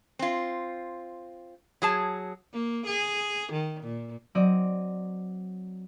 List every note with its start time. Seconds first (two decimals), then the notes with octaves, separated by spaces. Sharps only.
0.19 C4 F4
1.82 F#3 G#4 A5
2.53 A#3
2.87 G#4
3.52 D#3
3.83 A#2
4.35 F#3 C4 D5 D#5